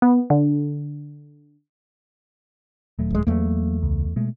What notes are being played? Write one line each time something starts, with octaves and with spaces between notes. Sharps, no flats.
B3
D3
D#1 F#3 A3
D1 G#3
E2 F#3 G3 A3 A#3
C#2
B2 G#3 A3